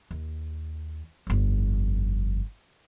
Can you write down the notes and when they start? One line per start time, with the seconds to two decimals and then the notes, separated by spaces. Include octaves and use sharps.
0.11 D#2
1.27 G1 F2